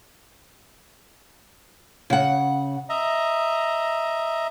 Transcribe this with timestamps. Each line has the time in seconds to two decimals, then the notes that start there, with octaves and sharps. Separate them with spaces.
2.10 C#3 F#5
2.89 D#5 E5 A#5